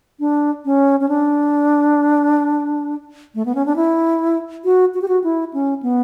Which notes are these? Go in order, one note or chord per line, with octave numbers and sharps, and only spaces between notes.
D4
C#4
C#4
D4
A3
B3
C#4
D4
E4
F#4
F#4
G4
F#4
E4
C#4
B3